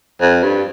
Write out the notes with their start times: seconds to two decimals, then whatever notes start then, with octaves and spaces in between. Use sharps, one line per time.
0.21 F2
0.43 G2